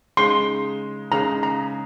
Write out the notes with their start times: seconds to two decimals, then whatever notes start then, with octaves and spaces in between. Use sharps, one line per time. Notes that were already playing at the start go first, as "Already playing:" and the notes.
0.17 C#3 G#3 D#4 G#4 C6
1.11 C#3 G#3 D#4 G#4 A#5
1.43 A#5